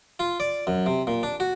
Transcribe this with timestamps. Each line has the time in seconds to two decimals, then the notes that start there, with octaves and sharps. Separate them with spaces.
0.19 F4
0.40 D5
0.67 F#2
0.86 C3
1.07 A#2
1.23 D4
1.40 F#4